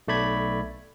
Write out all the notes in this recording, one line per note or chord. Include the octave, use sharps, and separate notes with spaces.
B1 A3 D5 B5 G#6